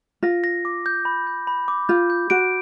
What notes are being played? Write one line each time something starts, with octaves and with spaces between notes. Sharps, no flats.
F4 A#6
A#6
D6
G6
B5
G6
B5
D6
F4 G6
G6
F#4 D7